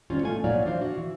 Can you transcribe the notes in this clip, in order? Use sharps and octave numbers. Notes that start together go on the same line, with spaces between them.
D#3 G3 C4 C#4 F4
G#3 A3 F4 G#5
A#2 F#3 D#4 C#5 D5 F5
E3 D4 C5 D5 F5
F#4
E3